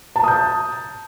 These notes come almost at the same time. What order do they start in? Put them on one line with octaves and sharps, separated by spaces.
A5 A#5 D#6 G6